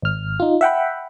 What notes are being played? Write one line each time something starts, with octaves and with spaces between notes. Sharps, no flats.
G#1 F6
D#4 F4
E5 F#5 G5 B5